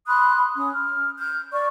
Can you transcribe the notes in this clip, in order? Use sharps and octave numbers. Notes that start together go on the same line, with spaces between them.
B5 C6 D#6 F#6
C#4 D#6
F6
F6 G6
D5 C#6